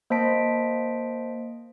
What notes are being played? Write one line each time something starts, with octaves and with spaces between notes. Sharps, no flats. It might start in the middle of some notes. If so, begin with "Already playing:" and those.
A#3 C5 D#5 A5 B6 D7